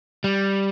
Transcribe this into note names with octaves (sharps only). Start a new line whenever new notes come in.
G3